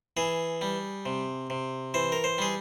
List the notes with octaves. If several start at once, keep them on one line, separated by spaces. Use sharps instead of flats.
E3 G#4
G3
C3
C3
E3 C5
A#4
C5
G3 G#4